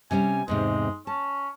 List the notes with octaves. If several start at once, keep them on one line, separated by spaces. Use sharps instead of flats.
C3 G3 C#4 G#5
E2 G#2 C3 G#3
C#4 A5